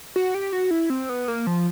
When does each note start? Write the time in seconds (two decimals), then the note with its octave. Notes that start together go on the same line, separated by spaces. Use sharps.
0.16 F#4
0.35 G4
0.53 F#4
0.71 E4
0.90 C4
1.09 B3
1.28 A#3
1.47 F3